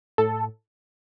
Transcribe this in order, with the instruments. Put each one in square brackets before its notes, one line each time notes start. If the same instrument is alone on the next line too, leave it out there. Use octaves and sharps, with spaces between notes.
[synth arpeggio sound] A2 A4